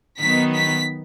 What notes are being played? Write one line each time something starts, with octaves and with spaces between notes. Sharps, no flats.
D#3 F#3 B3 D#4 B6
B6